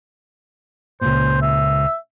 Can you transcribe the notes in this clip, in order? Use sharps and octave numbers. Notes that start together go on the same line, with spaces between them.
C#2 G2 A#2 C5
E5